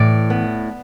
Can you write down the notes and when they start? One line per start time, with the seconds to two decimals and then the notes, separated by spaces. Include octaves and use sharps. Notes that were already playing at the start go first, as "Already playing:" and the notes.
Already playing: A2 E3 D5
0.30 B3